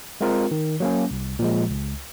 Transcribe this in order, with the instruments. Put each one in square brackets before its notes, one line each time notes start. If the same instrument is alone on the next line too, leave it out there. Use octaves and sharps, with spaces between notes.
[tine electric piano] G#3 C4 F4 A#4
D#3
F#3 A#3 C#4
C2
A#2 F3 G#3
C#2